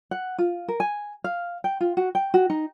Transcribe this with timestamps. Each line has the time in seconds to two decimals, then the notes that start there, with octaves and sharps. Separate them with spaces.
0.11 F#5
0.38 F4
0.68 A#4
0.80 G#5
1.24 F5
1.64 G5
1.81 F4
1.97 F#4
2.15 G5
2.34 F#4
2.50 D#4